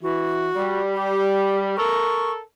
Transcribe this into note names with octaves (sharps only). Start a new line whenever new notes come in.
E3 F#4
G3
G4
A4 A#4 C#6